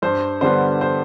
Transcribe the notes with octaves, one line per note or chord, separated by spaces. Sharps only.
G2 C5
D3 G3 B3 C5
C5